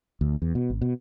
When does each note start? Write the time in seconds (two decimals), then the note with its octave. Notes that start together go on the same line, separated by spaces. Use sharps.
0.21 D2
0.42 E2
0.55 B2
0.70 G#1
0.82 B2